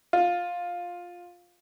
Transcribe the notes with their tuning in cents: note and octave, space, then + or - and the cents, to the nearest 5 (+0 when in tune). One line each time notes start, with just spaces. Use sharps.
F4 +10